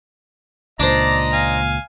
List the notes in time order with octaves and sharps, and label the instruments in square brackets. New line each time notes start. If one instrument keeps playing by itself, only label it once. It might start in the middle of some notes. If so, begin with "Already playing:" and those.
[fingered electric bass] C#2 A#2 [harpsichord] D4 C5 [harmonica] D5 [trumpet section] D#5 A#5
[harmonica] F5 G#5